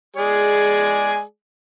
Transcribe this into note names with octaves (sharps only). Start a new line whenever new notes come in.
G#3 G#4 D5